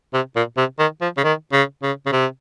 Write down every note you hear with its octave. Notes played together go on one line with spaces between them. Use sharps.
C3
A#2
C3
D#3
F3
C#3
D#3
C#3
C#3
C#3
C3